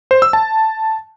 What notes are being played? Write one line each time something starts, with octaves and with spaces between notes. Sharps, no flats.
C5
E6
A5